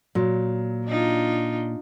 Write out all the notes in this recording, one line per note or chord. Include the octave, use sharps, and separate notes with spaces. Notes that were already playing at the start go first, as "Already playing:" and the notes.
A#2 F#3
D4 D#4 F4